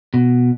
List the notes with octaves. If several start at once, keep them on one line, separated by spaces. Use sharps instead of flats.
B2